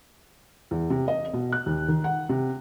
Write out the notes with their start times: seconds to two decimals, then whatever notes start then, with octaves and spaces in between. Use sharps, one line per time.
0.71 E2
0.90 C3
1.08 D#5
1.34 B2
1.52 F#6
1.66 D#2
1.88 D#3
2.04 F#5
2.29 C3